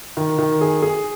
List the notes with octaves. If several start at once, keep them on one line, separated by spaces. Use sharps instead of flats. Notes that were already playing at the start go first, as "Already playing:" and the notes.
D#3
D#3
G#4
G#4